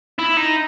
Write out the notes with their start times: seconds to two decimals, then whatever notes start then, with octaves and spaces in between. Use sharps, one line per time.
0.19 E4
0.37 D#4